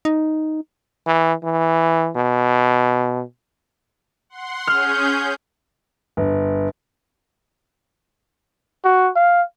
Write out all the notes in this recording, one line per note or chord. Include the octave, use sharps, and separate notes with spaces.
D#4
E3
E3
B2
F#5 C6
C#4 G#4 F6 G6
G1
F#4
F5